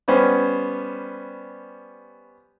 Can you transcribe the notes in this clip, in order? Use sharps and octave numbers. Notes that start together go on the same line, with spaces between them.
G3 B3 C#4 C5